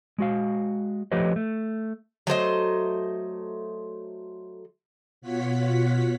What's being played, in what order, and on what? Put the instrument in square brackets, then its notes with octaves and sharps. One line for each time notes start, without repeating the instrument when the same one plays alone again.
[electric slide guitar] G#3 F#4 F5
F3 A3 G4 B4 C#5 D#5
A3
[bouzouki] F#3 A3 C5 D#5
[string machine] B2 F4 C#5 F#5 B6